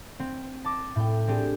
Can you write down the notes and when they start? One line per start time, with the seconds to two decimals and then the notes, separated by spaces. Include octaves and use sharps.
0.20 C4
0.64 A5 D6 A#6
0.96 A2 G5
1.28 C4 D4 G4 G#4